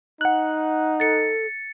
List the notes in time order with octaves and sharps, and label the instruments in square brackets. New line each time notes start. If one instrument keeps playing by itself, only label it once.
[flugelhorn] D#4 [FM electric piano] F#5 F#6
[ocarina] A4 [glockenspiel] A6 C#7